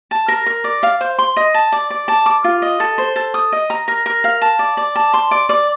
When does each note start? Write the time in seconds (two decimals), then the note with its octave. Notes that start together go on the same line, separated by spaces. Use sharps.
0.11 A5
0.28 A#4
0.46 A#4
0.64 D5
0.83 F5
1.01 C5
1.18 C6
1.37 D#5
1.54 A5
1.72 D5
1.90 D5
2.08 A5
2.26 D6
2.44 F4
2.62 D#5
2.80 A4
2.98 C5
3.16 A4
3.34 D#6
3.52 D#5
3.70 A#5
3.88 A#4
4.06 A#4
4.24 F5
4.42 A5
4.59 D5
4.77 D5
4.96 A5
5.14 C6
5.31 D5
5.49 D5